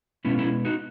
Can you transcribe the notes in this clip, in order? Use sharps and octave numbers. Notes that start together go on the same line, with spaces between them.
B2 G#3 B3 C#4 E4
C#4 E4
D#4 F#4